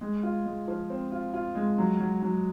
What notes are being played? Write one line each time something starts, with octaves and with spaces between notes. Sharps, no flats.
G#3
F4
G#3
F3
C4
F4
F4
G#3
F#3
F#3
F#3